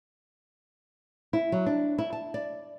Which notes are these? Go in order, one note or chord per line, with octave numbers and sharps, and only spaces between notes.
E4
F#3
D4
E4
A5
D5